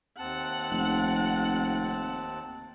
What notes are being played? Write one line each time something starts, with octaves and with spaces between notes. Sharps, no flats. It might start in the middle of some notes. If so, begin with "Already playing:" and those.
D#2 C4 F#5 A5
F1